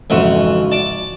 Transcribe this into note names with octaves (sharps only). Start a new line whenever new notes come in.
F2 G#2 C#3 E3 F#4
D5 A5